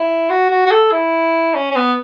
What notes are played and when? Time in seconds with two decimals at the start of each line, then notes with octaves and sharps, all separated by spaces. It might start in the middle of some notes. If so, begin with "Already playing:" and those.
Already playing: E4
0.29 F#4
0.50 F#4
0.66 F#4
0.71 A4
0.91 E4
1.55 C#4
1.71 C#4
1.76 B3